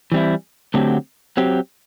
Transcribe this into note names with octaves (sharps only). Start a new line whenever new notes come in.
E3 G3 C4 E4
D3 F#3 A3 C4 G4
F#3 C4 G4